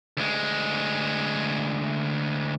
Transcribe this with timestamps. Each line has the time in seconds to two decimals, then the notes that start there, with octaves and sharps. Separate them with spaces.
0.17 D2 G#3